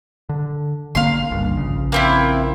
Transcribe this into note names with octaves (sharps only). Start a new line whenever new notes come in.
D3
G#1 D3 A#3 F5 C6
G1 C#2 G2
A#1 C#3
A#3 C4 E4